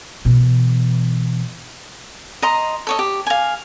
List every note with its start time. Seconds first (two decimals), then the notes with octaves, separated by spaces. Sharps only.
0.25 B2 E3
2.42 D#5 A#5 C6
2.87 A4 C#5 D#5
2.99 G4
3.27 F5 G#5